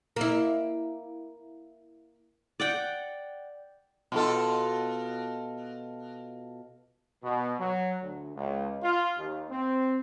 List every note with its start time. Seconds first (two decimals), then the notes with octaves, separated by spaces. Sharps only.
0.16 A#3 E4
2.60 D5 F#5 G5
4.12 B2 F4 A4
7.23 B2
7.60 F#3
8.02 D2
8.36 C#2
8.83 F4
9.19 D#2
9.51 C4